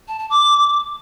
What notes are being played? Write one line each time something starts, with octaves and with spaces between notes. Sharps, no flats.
A5
A5
D6